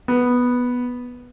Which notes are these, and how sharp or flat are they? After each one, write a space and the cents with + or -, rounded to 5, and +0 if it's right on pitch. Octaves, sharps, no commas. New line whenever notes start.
B3 -5